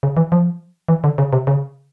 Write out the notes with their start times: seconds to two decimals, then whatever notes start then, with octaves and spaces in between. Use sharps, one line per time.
0.03 C#3
0.17 E3
0.32 F3
0.88 E3
1.04 D3
1.18 C#3
1.33 C3
1.47 C#3